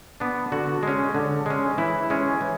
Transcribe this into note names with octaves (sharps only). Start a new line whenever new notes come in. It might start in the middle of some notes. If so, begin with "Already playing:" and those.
B3 D4
D3 F#4
G#3 C#4
D3
G#3 C#4
E3 E4
G#3 C#4
E3